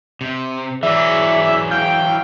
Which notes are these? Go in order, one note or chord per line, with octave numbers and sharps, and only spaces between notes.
C3
E3 F#3 G#4 D5 E5
F5 G5